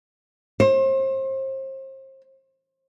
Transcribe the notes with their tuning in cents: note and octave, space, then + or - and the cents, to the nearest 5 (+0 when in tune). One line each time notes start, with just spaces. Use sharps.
C5 +35